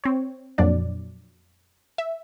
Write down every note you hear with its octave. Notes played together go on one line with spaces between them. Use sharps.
C4 C#5
F2 A#2 F#3 D4 D5
E5